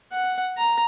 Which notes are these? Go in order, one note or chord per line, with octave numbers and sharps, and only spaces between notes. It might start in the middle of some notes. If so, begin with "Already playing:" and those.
F#5
A#5